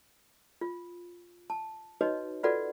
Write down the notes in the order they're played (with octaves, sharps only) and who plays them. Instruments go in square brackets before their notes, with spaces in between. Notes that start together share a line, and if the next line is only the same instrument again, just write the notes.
[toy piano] F4
A5
D#4 F#4 B4 C#5 D#5
F4 F#4 A4 B4 D5 F#5